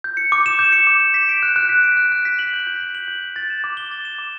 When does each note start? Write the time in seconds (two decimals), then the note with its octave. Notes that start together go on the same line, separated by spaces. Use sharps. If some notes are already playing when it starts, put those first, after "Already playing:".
0.04 G6
0.17 C#7
0.32 D6
0.46 E7
0.59 G6
0.72 C#7
0.87 D6
1.00 E7
1.14 B6
1.29 D7
1.43 F#6
1.56 F#6
1.69 B6
1.83 D7
1.97 F#6
2.12 F#6
2.25 B6
2.39 F#7
2.53 G6
2.67 G6
2.80 B6
2.95 F#7
3.08 G6
3.22 G6
3.36 A6
3.50 E7
3.64 D6
3.77 G7
3.91 A6
4.05 E7
4.18 D6